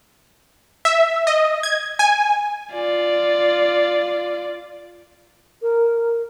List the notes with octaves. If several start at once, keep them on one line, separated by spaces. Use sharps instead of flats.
E5
D#5
G#6
G#5
F4 D5
A#4